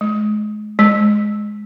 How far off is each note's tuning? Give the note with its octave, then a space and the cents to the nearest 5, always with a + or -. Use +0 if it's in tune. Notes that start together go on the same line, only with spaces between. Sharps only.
G#3 +35
G#3 +10